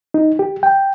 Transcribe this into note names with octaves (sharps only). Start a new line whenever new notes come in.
D#4
G4
G5